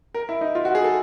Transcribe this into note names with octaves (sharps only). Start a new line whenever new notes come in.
A#4
E4
D#4
F4
F#4
G#4
A4